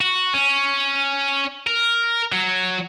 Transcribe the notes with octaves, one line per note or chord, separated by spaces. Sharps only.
F#4
C#4
A#4
F#3